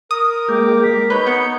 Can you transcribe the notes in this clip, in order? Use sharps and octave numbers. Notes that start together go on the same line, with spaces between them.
A#4 D#6
G#3 A#3 G5 D6
B6
D#4 B4 C#5 G6
B3 C#7